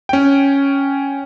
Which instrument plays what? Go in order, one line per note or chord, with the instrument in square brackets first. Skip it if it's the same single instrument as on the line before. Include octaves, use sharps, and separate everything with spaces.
[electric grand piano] C#4 G5